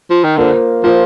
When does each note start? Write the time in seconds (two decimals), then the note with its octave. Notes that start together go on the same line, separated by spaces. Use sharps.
0.10 F3
0.24 D#3
0.37 D3 A#3 F4 C5
0.83 F3 A#3 F4 C5